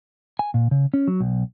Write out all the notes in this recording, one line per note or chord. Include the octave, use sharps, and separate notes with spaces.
G#5
A#2
C#3
C#4
F#3
B1